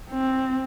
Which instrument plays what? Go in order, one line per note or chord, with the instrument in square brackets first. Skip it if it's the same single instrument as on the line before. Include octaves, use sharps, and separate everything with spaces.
[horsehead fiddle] C4